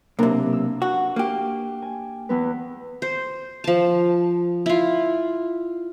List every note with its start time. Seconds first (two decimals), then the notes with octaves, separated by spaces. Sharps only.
0.19 B1 C3 A#3 D4 A#4
0.53 E6
0.82 F#4
1.16 A#3 G4
1.82 G#5
2.29 E2 B3 B4
3.02 C5
3.64 F3 A5
4.66 E4 F4